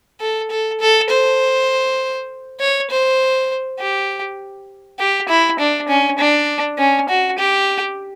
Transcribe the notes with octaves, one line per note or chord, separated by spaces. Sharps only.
A4
A4
A4
C5
C#5
C5
G4
G4
E4
D4
C#4
D4
C#4
F#4
G4